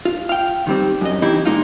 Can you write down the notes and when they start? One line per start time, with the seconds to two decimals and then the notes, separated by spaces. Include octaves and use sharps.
0.05 F4
0.29 F5 G5
0.67 D#3 G3 C4
1.01 F#2 D#5
1.22 E3 C4 D#4 E4 G4
1.45 A#2 G#3 D#4 F4